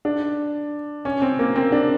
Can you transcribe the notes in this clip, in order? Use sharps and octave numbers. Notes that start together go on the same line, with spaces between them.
D4
C#4
C4
A#3
C4
D4